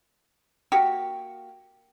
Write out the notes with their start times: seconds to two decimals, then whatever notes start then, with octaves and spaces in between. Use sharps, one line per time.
0.72 A#3 F#4 G4